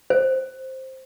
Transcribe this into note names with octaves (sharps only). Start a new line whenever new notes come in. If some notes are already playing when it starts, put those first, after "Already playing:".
C5